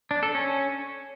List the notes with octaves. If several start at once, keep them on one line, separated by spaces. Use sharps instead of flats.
D4
A4
C#4